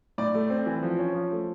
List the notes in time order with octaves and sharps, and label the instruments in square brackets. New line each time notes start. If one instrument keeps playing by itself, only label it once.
[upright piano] A2 D5
A3
C4
E3
F3
C#4
F3
A3